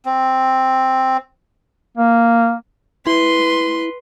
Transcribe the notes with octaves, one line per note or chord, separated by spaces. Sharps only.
C4
A#3
E4 B4 C6